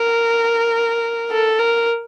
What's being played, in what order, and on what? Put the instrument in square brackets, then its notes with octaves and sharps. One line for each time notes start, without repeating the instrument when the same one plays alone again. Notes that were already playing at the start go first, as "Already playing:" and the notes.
Already playing: [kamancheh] A#4
A4
A#4